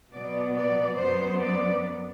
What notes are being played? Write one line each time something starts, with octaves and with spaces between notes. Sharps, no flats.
B2 F#3 B3 D5
D5
F#2 F#3 B3 C5
D5